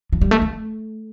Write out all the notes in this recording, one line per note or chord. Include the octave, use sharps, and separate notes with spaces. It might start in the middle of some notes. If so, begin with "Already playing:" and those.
F3
G3
A3
A3